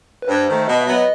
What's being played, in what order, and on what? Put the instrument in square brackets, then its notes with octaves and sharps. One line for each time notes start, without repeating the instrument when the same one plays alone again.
[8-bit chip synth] B4
[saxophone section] G2 [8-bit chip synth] C5
[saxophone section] D#3 A3
[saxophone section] B2 [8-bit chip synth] D#5
[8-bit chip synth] E5
[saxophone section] F#3 B3
[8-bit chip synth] D#5